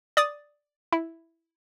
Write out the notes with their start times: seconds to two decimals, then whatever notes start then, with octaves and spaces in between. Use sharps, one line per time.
0.17 D5 D#6 A6
0.92 E4